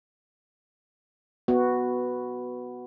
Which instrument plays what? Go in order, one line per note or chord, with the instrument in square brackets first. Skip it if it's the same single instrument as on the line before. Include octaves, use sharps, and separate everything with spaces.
[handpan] B3 F#4